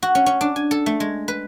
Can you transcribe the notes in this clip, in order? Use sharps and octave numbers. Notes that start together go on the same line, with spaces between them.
F#4
C#4
C#4
D4
G#5
A4
A3
G#3
B4